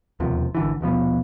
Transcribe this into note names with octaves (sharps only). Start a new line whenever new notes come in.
E1 D#2 C3 F3
G#1 D3 E3
D#1 B2 F3 B3